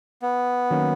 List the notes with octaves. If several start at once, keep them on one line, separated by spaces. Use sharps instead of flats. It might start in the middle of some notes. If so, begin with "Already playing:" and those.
B3
D#3 F#3 A#3 C#4